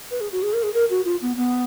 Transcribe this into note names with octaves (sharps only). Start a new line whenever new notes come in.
B4
G#4
F#4
G#4
A#4
G#4
A#4
F#4
F4
B3
B3